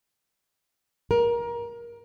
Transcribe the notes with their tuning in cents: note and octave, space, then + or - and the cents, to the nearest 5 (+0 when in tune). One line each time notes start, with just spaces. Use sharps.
A#4 +20